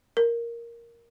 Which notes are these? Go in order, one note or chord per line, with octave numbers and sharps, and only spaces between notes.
A#4